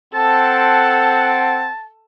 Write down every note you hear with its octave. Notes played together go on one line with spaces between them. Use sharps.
C4 A4 F#5 A5